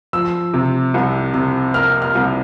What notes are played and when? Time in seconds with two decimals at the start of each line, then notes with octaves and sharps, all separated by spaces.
0.13 F3 E6
0.54 C3
0.94 C2
1.34 C3
1.74 A#3 F6
2.02 F6
2.15 C2